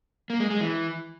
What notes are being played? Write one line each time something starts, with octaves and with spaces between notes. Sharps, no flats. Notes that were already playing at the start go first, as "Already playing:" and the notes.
A#3
G#3
G#3
E3